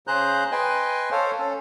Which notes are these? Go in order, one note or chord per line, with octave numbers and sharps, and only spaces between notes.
C#3 G#4 C5 A#5 F#6 G6
B4 D#5 G5 G#5 C6
A4 C5 C#5 F5
C#4 A4